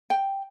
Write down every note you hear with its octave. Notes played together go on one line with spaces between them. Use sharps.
G5